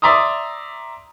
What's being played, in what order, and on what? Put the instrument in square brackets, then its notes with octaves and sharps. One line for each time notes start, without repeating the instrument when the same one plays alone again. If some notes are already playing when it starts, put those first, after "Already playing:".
[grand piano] D5 E5 A#5 C6 D#6